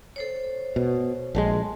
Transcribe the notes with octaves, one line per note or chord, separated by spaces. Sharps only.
A4 C5 C#5
B2
A#1 D3 G#3 A5 C6